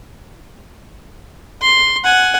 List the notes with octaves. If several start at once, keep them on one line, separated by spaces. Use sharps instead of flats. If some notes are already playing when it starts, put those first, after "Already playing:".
C6
F#5 G#5